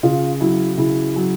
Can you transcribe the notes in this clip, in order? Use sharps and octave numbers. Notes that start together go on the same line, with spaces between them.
C#3 F4
F#3 E4
C#3 E4
F#3